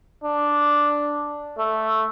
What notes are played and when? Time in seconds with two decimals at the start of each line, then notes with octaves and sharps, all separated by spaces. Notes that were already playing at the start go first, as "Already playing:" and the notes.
0.24 D4
1.58 A3